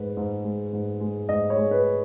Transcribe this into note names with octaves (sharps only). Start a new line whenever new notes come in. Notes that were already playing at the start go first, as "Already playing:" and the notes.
Already playing: G#2 G#3 B4
G#2
G#3
G#2
G#3
G#2 D#5
C#5
G#3
B4